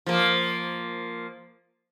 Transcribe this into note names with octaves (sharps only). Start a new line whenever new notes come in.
F3 A#3